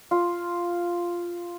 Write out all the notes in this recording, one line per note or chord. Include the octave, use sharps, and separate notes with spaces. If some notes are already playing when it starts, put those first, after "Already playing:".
F4